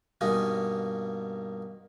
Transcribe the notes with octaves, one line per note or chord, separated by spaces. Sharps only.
G2 B2 A#3 D#4 G#5